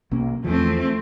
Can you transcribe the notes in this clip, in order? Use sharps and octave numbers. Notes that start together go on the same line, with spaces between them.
B1 A#3 C#4
E2 E3 F3 A3 C4